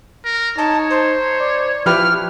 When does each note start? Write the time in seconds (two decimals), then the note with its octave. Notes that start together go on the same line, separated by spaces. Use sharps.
0.25 A#4
0.58 D#4 C#5 A5
0.90 C5
1.40 D5
1.86 F3 E4 G4 B4 F6